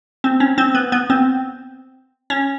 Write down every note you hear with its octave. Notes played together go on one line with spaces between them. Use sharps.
C4
C#4
C4
B3
B3
C4
C#4